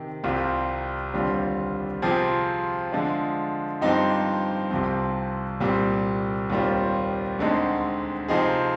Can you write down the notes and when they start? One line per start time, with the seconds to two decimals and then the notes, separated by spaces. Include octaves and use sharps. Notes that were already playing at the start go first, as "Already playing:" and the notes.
Already playing: C3 D#3
0.24 C2 C3 G3 C4 F4
1.14 D#2 D3 G3 C4 F4
2.02 C3 F3 C4 F4 G#4
2.92 D3 F3 G#3 D4
3.81 G2 F3 C4 D#4 G4
4.71 C2 C3 F3 C4
5.60 C2 A#2 G3 C4
6.50 D#2 D#3 G3 C4 F4
7.39 D2 D3 G#3 C4 D#4
8.28 C3 F3 C4 D#4 G#4